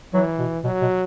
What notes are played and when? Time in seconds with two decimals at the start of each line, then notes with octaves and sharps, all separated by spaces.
0.14 E3 F#3
0.39 B2
0.64 B2 F#3
0.82 B2